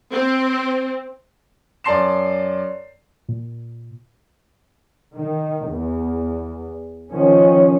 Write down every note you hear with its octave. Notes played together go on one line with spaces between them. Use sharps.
C4
F#2 D5 A5 C6 C7 E7
A#2
D#3
E2
D#3 F3 C#4